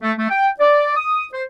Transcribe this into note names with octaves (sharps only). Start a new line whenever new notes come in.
A3
A3
G5
D5
D#6
C5